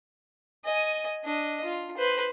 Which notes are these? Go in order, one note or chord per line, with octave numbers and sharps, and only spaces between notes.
D#5 G#5
D4 D#5
F4
B4 C5